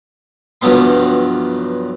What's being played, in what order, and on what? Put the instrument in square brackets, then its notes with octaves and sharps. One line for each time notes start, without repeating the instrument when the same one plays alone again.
[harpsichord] C2 G2 F3 F#3 B3 C6